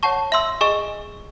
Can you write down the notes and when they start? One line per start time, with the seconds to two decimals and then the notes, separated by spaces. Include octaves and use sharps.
0.03 C#5 F#5 A5 C#6
0.32 E5 C6 E6
0.61 G#4 D#5 G#5 C#6